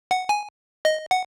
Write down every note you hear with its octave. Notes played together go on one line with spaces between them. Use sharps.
F#5
G#5
D#5
F#5